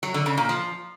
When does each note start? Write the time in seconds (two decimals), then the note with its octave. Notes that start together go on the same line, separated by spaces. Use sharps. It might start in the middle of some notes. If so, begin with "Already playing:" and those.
0.03 F#3
0.14 D3
0.26 C#3
0.37 A#2
0.49 F3